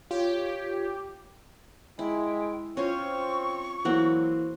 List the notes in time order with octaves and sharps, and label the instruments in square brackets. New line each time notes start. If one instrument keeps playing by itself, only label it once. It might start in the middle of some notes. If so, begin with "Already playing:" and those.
[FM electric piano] F4 [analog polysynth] G4 [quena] C#5
[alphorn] G#3 [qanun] E4 [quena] G5
[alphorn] C4 [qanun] C#4 F4 C5 [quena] C#6
[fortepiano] E3 A#3 [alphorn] F#3 [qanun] C4 F#4